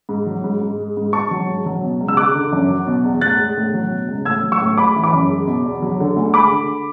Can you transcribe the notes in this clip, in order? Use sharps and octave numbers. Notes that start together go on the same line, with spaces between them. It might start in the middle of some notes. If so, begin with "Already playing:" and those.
G#2
F#3
G#2
G#2
G#3
G#2
G#2 A5 C#6
F#3
G#2
F#3
B2
C#2
E6
G#3 D6 F#6
D3
F#2
F#3
B2
E2
A2 F#6 A6
G#3
A2
F#3
B2
C#2
A2 E6 G#6
F#3
C#6 E6
A2
G#3 B5 D6
E3
B5 D6
F#2
G#3
B2
E2
F#3
D3
D2
G#3 B5 D6
D3